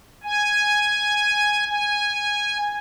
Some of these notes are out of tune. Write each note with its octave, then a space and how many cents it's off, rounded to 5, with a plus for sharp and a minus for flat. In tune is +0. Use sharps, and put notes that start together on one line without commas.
G#5 +0
G#5 -10